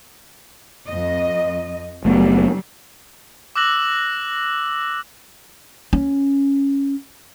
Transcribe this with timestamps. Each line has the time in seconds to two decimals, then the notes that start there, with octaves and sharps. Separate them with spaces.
0.88 F2 D#5
2.05 F#1 F#3 G3 A3 B3
3.56 D6 E6 F#6 A#6 F#7
5.93 C#4